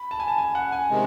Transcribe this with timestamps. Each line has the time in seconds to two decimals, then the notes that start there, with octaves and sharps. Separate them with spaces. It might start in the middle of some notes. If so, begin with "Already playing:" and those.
Already playing: B5
0.11 A5
0.20 G#5
0.28 A5
0.38 G#5
0.55 F#5
0.72 G#5
0.90 C3 D#3 G#3